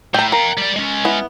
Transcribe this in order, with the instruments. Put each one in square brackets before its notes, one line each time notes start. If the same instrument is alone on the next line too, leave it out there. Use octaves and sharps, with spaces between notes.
[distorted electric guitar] A2 [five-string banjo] G5 A#5
[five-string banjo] A#4 [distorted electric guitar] F5 G5
[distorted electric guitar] G3 D5
G#3 C#4
[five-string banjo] B3 E4